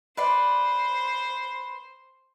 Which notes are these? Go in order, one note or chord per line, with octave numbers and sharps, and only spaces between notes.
B4 C5 D5 C6